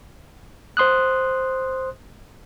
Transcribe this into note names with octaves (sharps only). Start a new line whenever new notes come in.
C5 C6 D#6 F#6